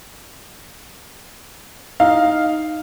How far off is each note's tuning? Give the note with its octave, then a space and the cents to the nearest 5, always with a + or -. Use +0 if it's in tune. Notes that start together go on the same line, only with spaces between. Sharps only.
D#4 +0 F5 +0